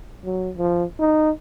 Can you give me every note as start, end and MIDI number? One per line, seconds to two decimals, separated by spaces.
0.25 0.50 54
0.57 0.84 53
0.99 1.30 63